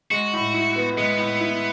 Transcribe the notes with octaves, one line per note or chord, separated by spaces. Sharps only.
G#3 F#4
A2
E4
B3
G#3 B3
A2
E4